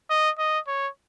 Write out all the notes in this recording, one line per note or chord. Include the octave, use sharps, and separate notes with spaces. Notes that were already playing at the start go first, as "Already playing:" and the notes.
D#5
D#5
C#5